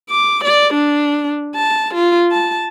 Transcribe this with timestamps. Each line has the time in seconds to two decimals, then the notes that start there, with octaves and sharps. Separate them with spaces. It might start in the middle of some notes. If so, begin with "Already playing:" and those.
0.10 D6
0.44 D5
0.74 D4
1.55 A5
1.94 F4
2.32 A5